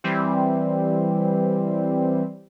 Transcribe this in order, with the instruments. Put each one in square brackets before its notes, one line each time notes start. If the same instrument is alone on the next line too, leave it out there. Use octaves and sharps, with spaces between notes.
[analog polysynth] E3 G3 C4